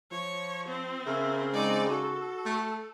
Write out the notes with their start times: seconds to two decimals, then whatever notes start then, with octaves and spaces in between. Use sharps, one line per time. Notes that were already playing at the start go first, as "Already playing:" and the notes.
0.12 F3 C#5
0.68 C4
1.06 C#3 A#4 E5
1.53 G#3 C4 D#4 D5
1.89 F#4 A4
2.46 A3